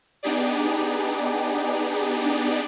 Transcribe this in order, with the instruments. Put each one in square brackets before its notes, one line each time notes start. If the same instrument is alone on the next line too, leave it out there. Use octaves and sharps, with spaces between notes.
[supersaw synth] B3 D4 D#4 G4 G#4 D5